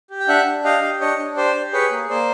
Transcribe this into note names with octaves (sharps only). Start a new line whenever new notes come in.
G4
G5
D4 E5 F#5
D4
G4 D#5 F5
G4
D4 C#5 D#5
D4
G4 C5 D5
G4
G#4 B4 C#5
A#3
A#3 C5 D5